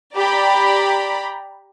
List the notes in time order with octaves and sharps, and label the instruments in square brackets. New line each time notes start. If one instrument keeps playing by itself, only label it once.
[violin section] G4 D5 A#5 B5